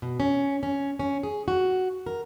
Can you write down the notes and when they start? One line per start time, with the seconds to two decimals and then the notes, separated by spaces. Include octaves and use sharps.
0.02 B2
0.20 C#4
0.63 C#4
0.99 C#4
1.23 G#4
1.48 F#4
2.06 A#4